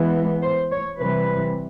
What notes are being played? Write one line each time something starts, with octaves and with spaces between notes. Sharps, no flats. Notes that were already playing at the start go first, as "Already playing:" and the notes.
Already playing: E3 G#3 B3
C5
C#5
C3 E3 G3 B4